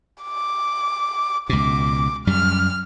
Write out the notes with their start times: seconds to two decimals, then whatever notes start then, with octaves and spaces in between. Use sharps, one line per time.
0.23 D6
1.49 C#2 B2 D6
2.27 F#2 G3 F6